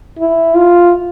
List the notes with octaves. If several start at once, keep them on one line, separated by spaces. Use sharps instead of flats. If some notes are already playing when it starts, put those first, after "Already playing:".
E4
F4